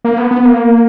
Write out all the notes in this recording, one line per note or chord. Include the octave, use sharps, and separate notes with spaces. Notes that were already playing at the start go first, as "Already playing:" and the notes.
A#3
B3
B3
A#3